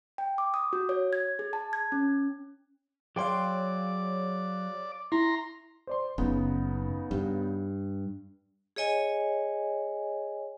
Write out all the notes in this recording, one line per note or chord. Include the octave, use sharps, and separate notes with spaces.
G5
D6
D#6
F#4
C#5
G#6
G#4
A5
G#6
C#4
F#3 G#4 C#5 D5 F5 G5 C6
E4 A#5 C6
C5 D5 C6
F#1 C#3 B3 D#4
G2
G#4 C#5 D#5 G#5